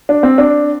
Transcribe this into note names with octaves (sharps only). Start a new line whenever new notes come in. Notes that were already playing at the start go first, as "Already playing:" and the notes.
D4
C4
D4